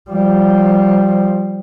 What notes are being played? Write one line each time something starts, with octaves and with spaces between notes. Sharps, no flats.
F3 G3